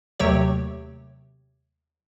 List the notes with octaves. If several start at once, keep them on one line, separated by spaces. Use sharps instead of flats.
D#2 C3 F#3 A3 G4 C#5